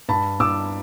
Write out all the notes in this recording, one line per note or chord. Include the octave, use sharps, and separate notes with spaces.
G2 A5 B5
G2 D6 E6